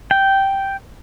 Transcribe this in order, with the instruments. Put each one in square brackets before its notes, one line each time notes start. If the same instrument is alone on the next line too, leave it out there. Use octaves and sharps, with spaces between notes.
[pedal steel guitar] G5